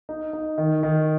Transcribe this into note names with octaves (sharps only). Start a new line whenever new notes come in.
D#4
D#4
D#3
D#3